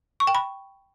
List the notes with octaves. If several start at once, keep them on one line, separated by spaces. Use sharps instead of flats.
C#6
G5
B5